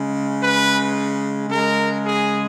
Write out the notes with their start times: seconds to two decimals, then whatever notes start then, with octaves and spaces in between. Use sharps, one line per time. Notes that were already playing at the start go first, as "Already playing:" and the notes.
Already playing: C#3 G#3
0.41 B4
1.49 C#3 G#3 A#4
2.03 G#4